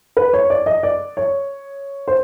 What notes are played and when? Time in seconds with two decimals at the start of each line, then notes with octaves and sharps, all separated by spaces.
0.17 B4
0.33 C#5
0.50 D5
0.66 D#5
0.83 D5
1.17 C#5
2.08 C5